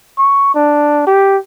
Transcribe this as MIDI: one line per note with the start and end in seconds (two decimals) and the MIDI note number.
0.18 0.51 85
0.55 1.02 62
1.07 1.37 67